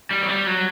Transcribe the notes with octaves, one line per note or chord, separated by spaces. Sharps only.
G3
F#3
G3
F#3